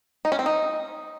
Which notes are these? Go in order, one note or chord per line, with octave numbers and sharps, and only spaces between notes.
D#4
C#4
C4
D#4